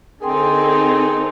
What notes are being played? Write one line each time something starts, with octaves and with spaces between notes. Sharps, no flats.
D3 C4 D#4 G#4 A#4 G5 C6